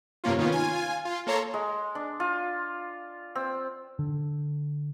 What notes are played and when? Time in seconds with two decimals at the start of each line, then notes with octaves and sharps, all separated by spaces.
0.24 G2 C3 A#3 C#4 F4
0.38 D#3 B3 C#4 F4
0.52 F4 G#5
1.05 F4
1.27 A#3 A4 C#5 A#5 C6
1.54 G#3
1.95 D4
2.20 F4
3.35 C4
3.99 D3